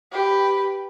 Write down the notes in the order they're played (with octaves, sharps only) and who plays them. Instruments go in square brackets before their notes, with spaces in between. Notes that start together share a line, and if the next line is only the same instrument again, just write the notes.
[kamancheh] G4 B4